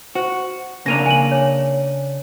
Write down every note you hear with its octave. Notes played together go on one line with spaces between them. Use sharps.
F#4 C5
C#3 A#3 D4 A#6 D#7 F7
G#5 D#7 F#7
C#5